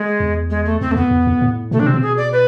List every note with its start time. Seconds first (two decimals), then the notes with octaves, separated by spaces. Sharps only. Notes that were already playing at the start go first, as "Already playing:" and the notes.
Already playing: G#3
0.20 E2
0.50 G#3
0.66 A3
0.81 E2 C4
0.91 A3
0.96 F2 B3
1.11 E2
1.27 F2
1.41 A2
1.71 B2 A3
1.80 D4
1.83 C3 C4
1.94 B2
2.02 G#4
2.17 D5
2.32 B4